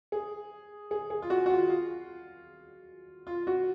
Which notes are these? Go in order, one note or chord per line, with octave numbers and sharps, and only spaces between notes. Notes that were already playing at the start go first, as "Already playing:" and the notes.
G#4
G#4
G#4
F4
F#4
F#4
F4
F4
F4
F#4